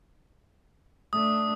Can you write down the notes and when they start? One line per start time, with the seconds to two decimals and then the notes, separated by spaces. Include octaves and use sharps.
1.13 A3 D4 D#6